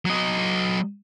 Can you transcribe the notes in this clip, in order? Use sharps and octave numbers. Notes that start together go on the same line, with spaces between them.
F#3 D#5